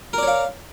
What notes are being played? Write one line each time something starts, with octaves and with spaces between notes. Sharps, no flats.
A#4 C#5 D5 F5